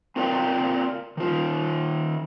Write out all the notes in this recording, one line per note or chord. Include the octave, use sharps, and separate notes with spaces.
C4 F4 A#4 D5 F5 G5
D#3 F4